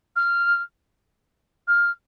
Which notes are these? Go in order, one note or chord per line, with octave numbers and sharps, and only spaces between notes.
F6
F6